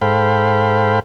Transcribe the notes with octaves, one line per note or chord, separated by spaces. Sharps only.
G#2 A4 C5 F5 G5 B5